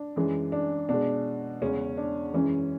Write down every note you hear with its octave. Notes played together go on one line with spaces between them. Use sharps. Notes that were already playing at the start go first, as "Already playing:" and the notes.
Already playing: D4
F#2 E3 G#3
D4
B2 G#3 D4
E2 C#3 G#3 C#4
D4
F#2 E3 G#3 C#4